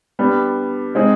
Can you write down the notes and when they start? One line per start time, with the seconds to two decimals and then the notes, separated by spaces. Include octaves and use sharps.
0.19 G3 B3 D4
0.95 G#3 C4 D#4 G#4